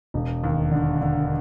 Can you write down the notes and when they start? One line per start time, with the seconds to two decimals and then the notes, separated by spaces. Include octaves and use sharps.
0.14 E1
0.44 D#2
0.72 D3
1.02 D3